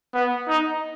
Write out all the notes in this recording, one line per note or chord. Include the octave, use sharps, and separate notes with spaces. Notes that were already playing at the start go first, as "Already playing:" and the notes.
B3
D#4